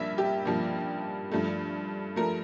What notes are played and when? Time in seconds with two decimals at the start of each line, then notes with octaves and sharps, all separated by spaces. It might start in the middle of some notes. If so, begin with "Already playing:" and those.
Already playing: G2 F3 A#3 E5
0.18 G4
0.45 G2 F3 A#3
1.32 G2 F3 A3
2.16 F3 A3 A#4